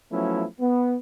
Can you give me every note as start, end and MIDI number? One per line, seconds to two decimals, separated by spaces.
0.12 0.44 53
0.12 0.44 54
0.12 0.44 57
0.12 0.44 59
0.12 0.44 61
0.12 0.44 64
0.60 0.96 59